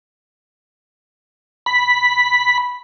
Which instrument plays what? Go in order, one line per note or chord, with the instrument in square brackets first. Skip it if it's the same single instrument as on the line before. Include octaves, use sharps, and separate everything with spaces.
[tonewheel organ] B5